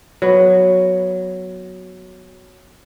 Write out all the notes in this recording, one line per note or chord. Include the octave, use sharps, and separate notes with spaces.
F#3 B3